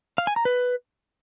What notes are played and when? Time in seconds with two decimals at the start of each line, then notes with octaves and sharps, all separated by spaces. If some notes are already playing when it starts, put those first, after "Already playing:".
0.18 F5
0.27 G#5
0.36 A#5
0.45 B4